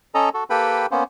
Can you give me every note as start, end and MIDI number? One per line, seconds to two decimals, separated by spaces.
0.15 0.29 61
0.15 0.29 69
0.15 0.29 75
0.15 0.29 82
0.34 0.44 66
0.34 0.44 69
0.50 0.86 58
0.50 0.86 67
0.50 0.86 69
0.50 0.86 71
0.50 0.86 79
0.50 0.86 83
0.91 1.04 58
0.91 1.04 59
0.91 1.04 61
0.91 1.04 72